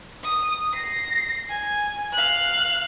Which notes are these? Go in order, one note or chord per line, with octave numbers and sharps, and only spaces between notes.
D#6
A#6 C7
G#5
F5 F#6